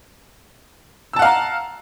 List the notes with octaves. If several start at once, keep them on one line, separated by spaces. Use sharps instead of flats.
F5 F#5 A5 A#5 E6